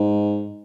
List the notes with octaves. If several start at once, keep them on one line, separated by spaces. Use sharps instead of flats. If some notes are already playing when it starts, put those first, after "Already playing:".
Already playing: G#2